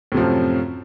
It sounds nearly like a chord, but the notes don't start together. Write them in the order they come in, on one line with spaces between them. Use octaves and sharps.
A2 C3 F3 F#2